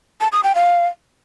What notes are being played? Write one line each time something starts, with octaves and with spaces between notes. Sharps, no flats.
A5
D#6
G5
F5